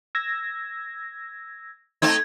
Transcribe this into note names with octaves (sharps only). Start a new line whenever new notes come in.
E6 G#6 A#6
A3 C4 D#4 G#6